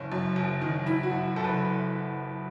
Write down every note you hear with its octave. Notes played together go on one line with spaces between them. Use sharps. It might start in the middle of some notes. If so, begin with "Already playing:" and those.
Already playing: F#1 C#4
F#2
F#1
D#3
F#1 E4
F#4
F#2
F#1 A4
B4